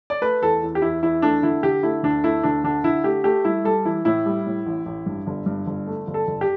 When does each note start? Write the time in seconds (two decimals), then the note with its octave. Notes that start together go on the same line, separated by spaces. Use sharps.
0.10 D5
0.21 A3 B4
0.42 E2 A4
0.62 E2
0.75 G4
0.82 E2 E4
1.03 E2 E4
1.22 A3 D4
1.43 D3 E4
1.63 D3 G4
1.83 A3 E4
2.03 D2 D4
2.24 A3 E4
2.43 D2 D4
2.64 D3 D4
2.84 D3 E4
3.04 A3 G4
3.24 A3 G4
3.45 G3 E4
3.64 G3 A4
3.85 E3 E4
4.05 A2 E4
4.26 G3
4.46 A2
4.66 A1
4.86 A1
5.06 G2
5.27 G1
5.46 G2
5.66 G1
5.87 A3
6.07 G1
6.14 A4
6.27 G1
6.41 G4